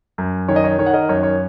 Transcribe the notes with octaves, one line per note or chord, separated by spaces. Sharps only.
F#2
D#3 C#5
D#5
C#5
D#3 C#5
F#5
A#4 D#5
F#2 C#5
C#5